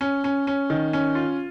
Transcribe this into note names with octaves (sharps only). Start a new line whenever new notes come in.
C#4
C#4
C#4
D#3
C#4
F4